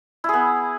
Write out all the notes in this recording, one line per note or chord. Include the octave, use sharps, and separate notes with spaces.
B3 E4 G#4